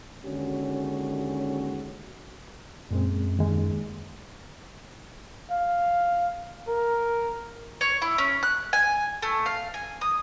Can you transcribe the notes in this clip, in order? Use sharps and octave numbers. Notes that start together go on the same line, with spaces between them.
D#2 D3 G#3 C#4 F#4
F#2 A#2 G#3 C4
D#2 G#3
F5
A#4
C#5
E4
C#4
F#6
G#5
A3
F5
G#5
D#6